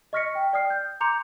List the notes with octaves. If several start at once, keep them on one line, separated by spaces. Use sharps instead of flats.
D#5 C#6 F6 A#6 B6 C#7
G5
D5 G5 D#6 F6 C7
G6
A#5 C6 D6 G6 C#7 F7